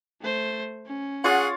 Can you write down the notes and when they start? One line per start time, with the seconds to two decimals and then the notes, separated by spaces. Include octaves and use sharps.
0.22 A3 C5
0.86 C#4
1.24 F4 G#4 C#5 F#5